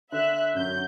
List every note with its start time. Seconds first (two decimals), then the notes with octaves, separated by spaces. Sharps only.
0.12 D3 E5 F#6
0.54 F#2 G6